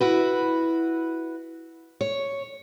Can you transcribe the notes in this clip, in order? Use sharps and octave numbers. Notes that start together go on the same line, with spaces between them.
E4 F#4 B4
C#5